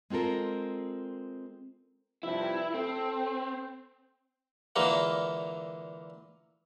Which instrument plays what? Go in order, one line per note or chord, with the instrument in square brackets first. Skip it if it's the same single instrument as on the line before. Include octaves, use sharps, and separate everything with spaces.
[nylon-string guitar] G#3 C4 F4 A4 A#4
[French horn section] G2 C3 F3 [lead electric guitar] E4
[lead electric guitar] C4 [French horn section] A4
[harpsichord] A#2 D3 E3 G#3 A#3